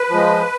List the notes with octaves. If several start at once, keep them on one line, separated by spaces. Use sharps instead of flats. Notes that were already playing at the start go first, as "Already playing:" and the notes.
Already playing: B4
F3 G#3